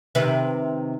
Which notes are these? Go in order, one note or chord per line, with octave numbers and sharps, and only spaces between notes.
C3 D#3 B4